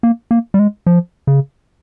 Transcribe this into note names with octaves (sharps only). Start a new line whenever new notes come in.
A#3
A#3
G3
G#3
F3
C#3